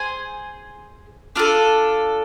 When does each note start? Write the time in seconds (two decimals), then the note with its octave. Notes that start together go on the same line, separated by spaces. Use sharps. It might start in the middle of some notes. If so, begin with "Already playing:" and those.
Already playing: G#4 C5 G#5
1.36 D4 F4 A4